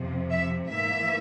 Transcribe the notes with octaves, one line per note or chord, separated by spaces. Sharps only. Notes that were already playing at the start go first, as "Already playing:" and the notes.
Already playing: F2 C3 F3
E5
G#2 E3 A#3 E5